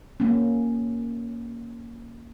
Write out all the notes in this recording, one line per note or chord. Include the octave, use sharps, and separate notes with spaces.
A#3 C#4